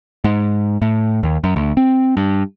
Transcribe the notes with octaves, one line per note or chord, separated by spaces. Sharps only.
G#2
A2
D#2
F#2
D2
C4
G2